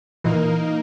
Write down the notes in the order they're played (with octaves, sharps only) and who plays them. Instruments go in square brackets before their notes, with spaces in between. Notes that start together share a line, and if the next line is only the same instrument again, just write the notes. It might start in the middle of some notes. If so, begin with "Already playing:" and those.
[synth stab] A#2 E3 [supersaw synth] A#3 D#4 A#4